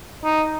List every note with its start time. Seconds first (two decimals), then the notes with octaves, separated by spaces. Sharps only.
0.25 D#4